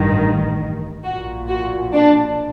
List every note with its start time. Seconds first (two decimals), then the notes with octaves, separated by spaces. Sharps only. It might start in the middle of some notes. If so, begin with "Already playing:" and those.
Already playing: A1 G2 D#3
1.04 A#1 A#2 F#4
1.48 F#4
1.93 D4